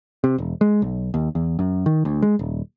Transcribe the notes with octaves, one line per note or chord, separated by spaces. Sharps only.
C3
E1
G#3
B1
D#2
E2
F#2
D#3
D2
G#3
D#1